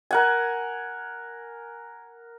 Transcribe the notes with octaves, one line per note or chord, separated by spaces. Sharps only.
A#4 F#5 G#5